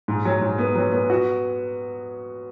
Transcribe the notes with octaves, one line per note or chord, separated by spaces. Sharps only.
G#2
F#3
G#2
B3
F#3
B3
F#4